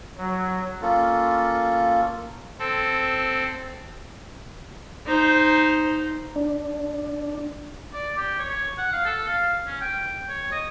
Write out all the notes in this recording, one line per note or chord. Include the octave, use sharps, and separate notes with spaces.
F#3
A#3 C#4 F4 A4
C4 A4
D#4 C5
D4
D5
G4
C#5
F#5
F5
A4
F5
C#4
G5
C#5
D#5